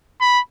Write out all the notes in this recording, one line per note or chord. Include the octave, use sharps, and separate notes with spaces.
B5